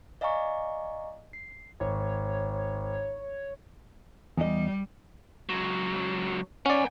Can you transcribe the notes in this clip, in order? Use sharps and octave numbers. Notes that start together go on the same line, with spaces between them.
D5 D#5 F5 G#5 A#5 C#6
C7
G#1 C#5
E2 G3 D#5
C#2 F#3
C#4 D5 F#5 G#5